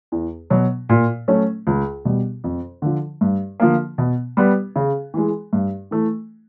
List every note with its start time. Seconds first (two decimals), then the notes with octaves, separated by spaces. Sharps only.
0.12 E2
0.50 B2 F#3
0.89 A#2
1.28 F#3 A3 C#4
1.67 C#2
2.05 B2 G3
2.44 F2
2.82 D3 F3
3.21 G2
3.60 D3 F3 A#3
3.98 B2
4.37 G3 B3
4.76 C#3
5.14 E3 G#3
5.53 G2
5.91 E3 A3